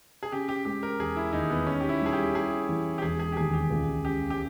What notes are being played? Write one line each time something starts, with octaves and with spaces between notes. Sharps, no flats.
G#4
C#3 G4
G4
G#3 G4
A#4
E1 G#4
E4
D#2 D#4
B3
C#4 D#4
G4
E4
G3 G#4
G4
E4 G#4
E3
G4
E1 G#4
G#4
G4
D#2 G#4
G4
C#2
C#3 G4
G4